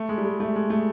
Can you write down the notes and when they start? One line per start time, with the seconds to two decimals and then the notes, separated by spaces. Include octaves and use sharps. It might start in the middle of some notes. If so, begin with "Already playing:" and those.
Already playing: A3
0.09 G#3
0.18 G3
0.25 G#3
0.40 A3
0.56 G#3
0.70 A3